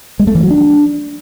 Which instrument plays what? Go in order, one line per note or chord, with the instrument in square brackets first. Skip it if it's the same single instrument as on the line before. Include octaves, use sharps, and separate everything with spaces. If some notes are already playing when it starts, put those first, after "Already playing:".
[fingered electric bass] G#3
A3
E3
F#3
D4